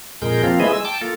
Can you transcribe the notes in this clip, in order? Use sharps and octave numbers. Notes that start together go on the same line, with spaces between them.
F2 A#2 G#3 G#4 A#4 G6
F3 A#3 C4 F4
G#3 A3 E4 G#4 B4 D#5
G#3 E6
G5 A5 D6
A#3 F4 A4